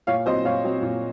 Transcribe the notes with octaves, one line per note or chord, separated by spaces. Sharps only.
A#2 C#5 F5
F#3 C4 C5 D#5
A#2 C#5 F5
F#3 C4
A#2